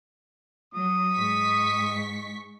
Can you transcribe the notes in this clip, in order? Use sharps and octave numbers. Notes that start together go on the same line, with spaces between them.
F#3 D#6
G#2 C#6 B6